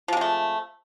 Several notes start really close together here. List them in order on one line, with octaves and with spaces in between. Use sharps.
F3 C3 G#3 A3